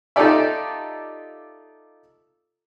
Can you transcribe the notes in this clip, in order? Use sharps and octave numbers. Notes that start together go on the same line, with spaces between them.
D#4 F4 G4 A4 D5 E5